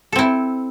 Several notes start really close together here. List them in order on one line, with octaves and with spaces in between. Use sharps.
A4 C4 E4